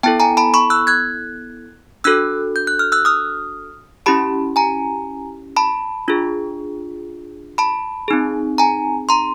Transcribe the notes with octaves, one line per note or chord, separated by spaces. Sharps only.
B3 E4 A4 G5 A5
G#5 A#5
A5 B5
B5 C#6
E6 F#6
F#6 G#6
D4 F#4 A4 E6 F#6
G6
F#6
F6
E6 F#6
D#6 F6
C#4 E4 G4 A5 B5
G#5 A#5
A5 B5
D4 F4 G#4
A5 B5
C4 D#4 G#4
G#5 A#5
A#5 C6